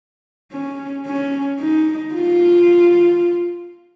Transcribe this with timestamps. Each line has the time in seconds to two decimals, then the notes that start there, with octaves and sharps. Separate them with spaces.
0.52 C#4
1.07 C#4
1.61 D#4
2.15 F4